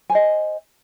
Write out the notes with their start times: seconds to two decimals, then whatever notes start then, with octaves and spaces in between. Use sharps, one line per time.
0.10 G#5
0.12 C5
0.15 D#5